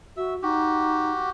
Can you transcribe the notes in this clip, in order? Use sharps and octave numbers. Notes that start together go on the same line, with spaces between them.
F#4 E5
D#4 F#4 G4